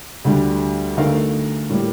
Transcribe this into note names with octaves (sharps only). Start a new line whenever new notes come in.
D2 D3 G3 D4
D3 A3 D#4 A#4 F5
A2 G3 A#3